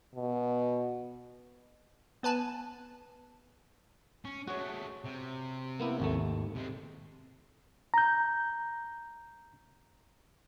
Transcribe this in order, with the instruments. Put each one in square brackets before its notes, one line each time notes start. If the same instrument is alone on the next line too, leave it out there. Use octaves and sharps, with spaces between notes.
[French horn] B2
[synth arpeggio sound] B3 B4 G#5 A5
[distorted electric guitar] C#4
[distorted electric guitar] G#3 A3 [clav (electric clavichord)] F#4 C#5
[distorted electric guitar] C3
[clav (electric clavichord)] A#3 B3 E4
G#1 D#2 A3
[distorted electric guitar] C3 G#3
[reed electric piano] A#5 G6